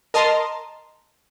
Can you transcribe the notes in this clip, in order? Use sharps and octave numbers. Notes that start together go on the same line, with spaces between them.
A#4 D#5 A5 A#5 C6